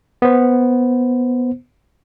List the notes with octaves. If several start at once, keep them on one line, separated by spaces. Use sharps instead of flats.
B3 C5